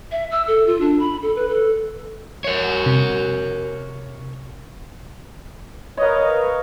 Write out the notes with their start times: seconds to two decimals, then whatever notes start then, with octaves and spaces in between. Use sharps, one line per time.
0.12 E5
0.31 E6
0.48 A4
0.67 F4
0.81 D4
1.00 B5
1.22 A4
1.36 B4
1.49 A4
2.44 A#4 C#5
2.86 C3
5.97 A#4 B4 C#5 D#5 F5